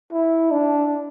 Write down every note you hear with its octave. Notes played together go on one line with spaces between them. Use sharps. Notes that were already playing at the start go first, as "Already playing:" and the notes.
E4
D4